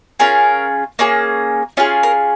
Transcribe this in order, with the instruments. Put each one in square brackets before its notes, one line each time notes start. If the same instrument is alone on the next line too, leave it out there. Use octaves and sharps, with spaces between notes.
[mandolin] C#4 F4 G#4 A#4
A#3 C#4 G#4
C#4 F4 G#4 C#5
A#4